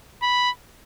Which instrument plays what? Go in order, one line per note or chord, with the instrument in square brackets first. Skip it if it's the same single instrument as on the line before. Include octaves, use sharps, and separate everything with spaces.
[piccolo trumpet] B5